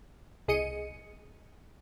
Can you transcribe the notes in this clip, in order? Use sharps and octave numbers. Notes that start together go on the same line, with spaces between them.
C2 G#4 D#5 C#7 D#7